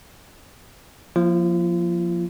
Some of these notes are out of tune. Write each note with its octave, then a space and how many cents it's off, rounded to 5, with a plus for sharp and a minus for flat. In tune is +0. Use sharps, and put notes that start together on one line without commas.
F3 +15 A#3 +35 F4 -40